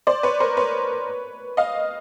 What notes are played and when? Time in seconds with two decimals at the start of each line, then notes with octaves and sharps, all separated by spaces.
0.07 C5 D5
0.23 B4 C#5
0.40 A#4 C5
0.57 B4 C#5
1.57 D#5 F5